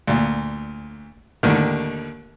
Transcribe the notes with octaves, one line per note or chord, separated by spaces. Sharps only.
D2 A#2
D#2 A2 D3 D#3